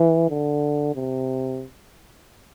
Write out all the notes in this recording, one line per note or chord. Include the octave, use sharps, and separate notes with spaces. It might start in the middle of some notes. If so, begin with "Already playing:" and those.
Already playing: E3
D3
C3